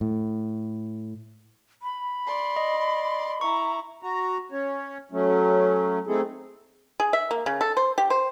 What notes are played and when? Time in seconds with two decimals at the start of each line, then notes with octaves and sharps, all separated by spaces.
0.01 A2
1.82 B5
2.26 D5 C6
2.56 D#5
3.41 E4 A#5 C#6
4.03 F#4 A#5
4.52 C#4 C#5
5.12 F#3 A3 C#4
6.07 A3 C4 D#4 E4 G#4 A4
7.00 G#4
7.13 E5
7.31 A#3
7.46 C#3
7.61 A4
7.77 C5
7.98 G4
8.10 C5